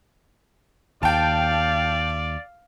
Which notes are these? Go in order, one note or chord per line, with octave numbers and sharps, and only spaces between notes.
D#2 D5 F5 G5 A5